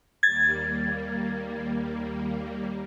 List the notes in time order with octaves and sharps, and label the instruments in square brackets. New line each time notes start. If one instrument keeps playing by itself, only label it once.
[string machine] D#2 G3 A#3 [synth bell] G#6 A6